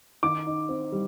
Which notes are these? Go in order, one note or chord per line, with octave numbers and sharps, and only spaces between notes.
D#3 D6
D#4
C4
G3